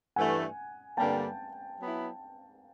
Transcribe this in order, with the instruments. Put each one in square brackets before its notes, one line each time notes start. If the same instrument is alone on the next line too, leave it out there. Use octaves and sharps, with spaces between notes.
[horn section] G2 E3 A3 [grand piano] F#5 G#5
[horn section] G2 D3 G3 A#3 [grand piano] G5 A5
[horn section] F#3 B3 E4